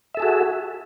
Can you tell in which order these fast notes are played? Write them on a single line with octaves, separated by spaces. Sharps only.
E5 A4 G#4 F#4